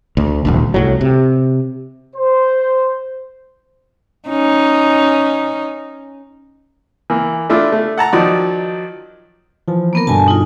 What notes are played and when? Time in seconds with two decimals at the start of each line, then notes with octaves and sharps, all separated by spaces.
0.17 D2
0.45 D#1 G#1 D2
0.74 C2 A2 F#3
1.01 C3
2.16 C5
4.29 C#4 D#4
7.10 E3 A#3
7.50 A3 D4 E4 F4
7.72 A3
7.98 F#5 A5 A#5
8.13 D#3 F3 F#3 D#4 D5
9.68 E3 F3
9.93 A#3 B3 A#4
10.07 G2 B2 D3 G#5 A5
10.28 D#4 F4